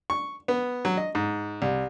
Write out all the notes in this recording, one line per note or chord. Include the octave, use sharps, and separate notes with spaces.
C#6
B3
F#3
D#5
G#2
C2